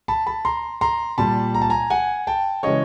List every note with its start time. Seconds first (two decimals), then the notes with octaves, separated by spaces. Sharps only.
0.08 A5 B5
0.27 A5 B5
0.45 A#5 C6
0.81 A#5 C6
1.18 A#2 G3 A5 B5
1.55 A#5
1.62 A5
1.70 G#5 A#5
1.90 F#5 G#5
2.27 G5 A5
2.63 C#3 E3 G#3 C#5 D#5